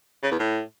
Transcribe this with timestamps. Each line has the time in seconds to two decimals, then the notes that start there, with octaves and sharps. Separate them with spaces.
0.23 C#3
0.31 E2
0.39 A2